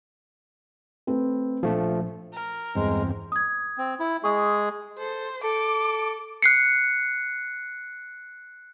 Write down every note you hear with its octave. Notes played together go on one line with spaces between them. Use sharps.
A3 C4 B4
A#1 F3 A3
A#4
E2 G2 G#3 C4
D#6 G#6
C4
E4
G#3 G#4 C#6 D#6
A4 C5
A4 D6
F#6 C7 C#7